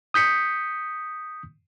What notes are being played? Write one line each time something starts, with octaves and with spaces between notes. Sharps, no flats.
D#6 G6 B6 C#7